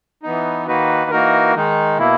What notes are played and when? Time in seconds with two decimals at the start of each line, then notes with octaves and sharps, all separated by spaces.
0.23 E3 B3 D#4
0.67 D#3 A#3 D#4 F#4 B4
1.11 E3 A#3 D#4 F#4 A#4
1.55 D#3 G#3 D#4
1.98 B2 A#3 E4